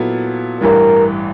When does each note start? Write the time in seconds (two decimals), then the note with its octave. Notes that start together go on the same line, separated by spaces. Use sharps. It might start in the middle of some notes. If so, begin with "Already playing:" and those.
Already playing: A#2 F#3 B3 E4 A4
0.61 A1 G2 E3 G3 A#4